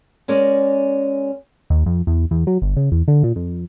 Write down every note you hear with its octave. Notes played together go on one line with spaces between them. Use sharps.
G#3 C#4 A#4 D5
D#2
F2
E2
E2
F#3
G1
C#3
E2
D3
A#2
F2